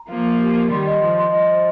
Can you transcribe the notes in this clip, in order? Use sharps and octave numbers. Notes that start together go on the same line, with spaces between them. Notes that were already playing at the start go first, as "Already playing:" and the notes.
Already playing: A#5
F3 A#3 F5
A#4
G4
A#4
D#3 G3 C6
D#5
F3 C6
C6
F3 D#5
C5